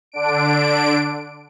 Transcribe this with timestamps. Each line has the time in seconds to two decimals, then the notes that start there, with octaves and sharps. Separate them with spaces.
0.12 D3 D4 D7